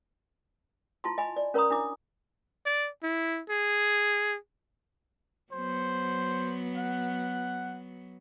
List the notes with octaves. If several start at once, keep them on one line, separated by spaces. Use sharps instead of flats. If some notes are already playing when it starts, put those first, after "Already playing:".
E4 F4 A5 C6
D#5 G#5 B5
D5
C#4 A#4 C#5 A#5 B5 D#6
D4 E4 D6
D5
E4
G#4
F#3 B3 C5
F#5